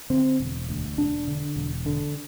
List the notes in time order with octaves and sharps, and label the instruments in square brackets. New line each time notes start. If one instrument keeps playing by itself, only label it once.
[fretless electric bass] D3 C4
E1
D2
E1 D4
D3
E1
D3